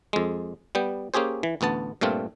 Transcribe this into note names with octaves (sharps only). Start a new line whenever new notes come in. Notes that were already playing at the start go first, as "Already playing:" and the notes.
F2 G#3
G3 B3 G5
A#3 C#4 G4 G#4 C5
E3
A1 D2 B3 A5
G2 A#2 A3 C4 F4